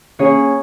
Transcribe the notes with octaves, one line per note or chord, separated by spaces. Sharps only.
A#3 C#4 G#4 C#5